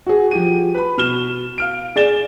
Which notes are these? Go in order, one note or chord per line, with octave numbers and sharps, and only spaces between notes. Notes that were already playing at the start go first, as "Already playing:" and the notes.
F#4 G#4
F3 G4 D#7
B4 B5
B2 F6 E7 G7
F5 F6 D7
G#4 D5 A6 E7 G7